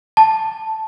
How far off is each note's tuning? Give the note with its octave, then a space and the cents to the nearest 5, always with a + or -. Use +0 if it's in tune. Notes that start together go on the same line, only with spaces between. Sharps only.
A5 +0